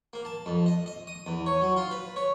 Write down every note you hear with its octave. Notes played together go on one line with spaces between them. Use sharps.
A#3
A5
F2
D#5
D#5
D#6
E2
C#5
F#3
F4
B4
C#5